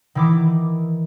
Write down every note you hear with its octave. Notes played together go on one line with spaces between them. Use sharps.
D#3 E3 D6